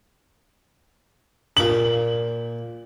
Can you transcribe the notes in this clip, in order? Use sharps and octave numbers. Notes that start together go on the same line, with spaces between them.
A#2 D6 F#7